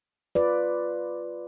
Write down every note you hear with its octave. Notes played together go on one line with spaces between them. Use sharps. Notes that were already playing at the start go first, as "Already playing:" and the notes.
F4 B4 D5